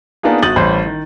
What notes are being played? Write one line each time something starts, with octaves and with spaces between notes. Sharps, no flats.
A#3 B3 D4 D#4 F4 G#4
G1 F#4 D#6 G6 A6 F#7
A1 G3 C5 C#5 B5 C6
D#3